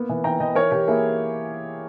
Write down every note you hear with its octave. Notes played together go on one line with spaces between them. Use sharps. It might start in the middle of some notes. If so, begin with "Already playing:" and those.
Already playing: A#3 B3
E3
E3 G5 A#5
E3 D#5 G5
E3 A#4 C#5
E3 G4 A#4
A#3 E4 G#4